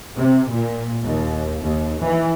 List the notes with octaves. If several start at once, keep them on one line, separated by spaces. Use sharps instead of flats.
C3
A#2
D#2
D#2
E3